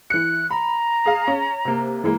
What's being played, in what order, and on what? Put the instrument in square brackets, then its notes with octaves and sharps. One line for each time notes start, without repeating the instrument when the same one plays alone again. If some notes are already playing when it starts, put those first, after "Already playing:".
[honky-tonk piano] E3 C#7 [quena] F#6
[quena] A#5 [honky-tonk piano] B5
[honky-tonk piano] G#4 F5
C#4
C3 A#3
E3 G#3 A#3